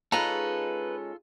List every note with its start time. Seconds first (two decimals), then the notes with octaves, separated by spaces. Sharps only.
0.12 G#3 C#4 D#4 F4 A4 B4 A#5